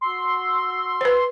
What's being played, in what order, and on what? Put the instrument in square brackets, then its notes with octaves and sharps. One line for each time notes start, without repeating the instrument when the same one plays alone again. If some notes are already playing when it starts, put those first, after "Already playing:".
[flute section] F#4 E6 [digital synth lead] C6
[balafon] B4 C5